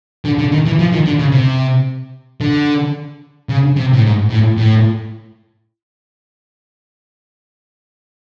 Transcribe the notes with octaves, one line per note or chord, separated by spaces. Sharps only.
D3
D3
D#3
E3
F3
D#3
D3
C#3
C3
D3
C#3
C3
A2
G#2
A2
A2